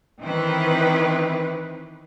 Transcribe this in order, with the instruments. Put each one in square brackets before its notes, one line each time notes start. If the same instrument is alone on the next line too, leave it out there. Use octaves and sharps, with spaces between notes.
[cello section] D#3 E3 C4 B4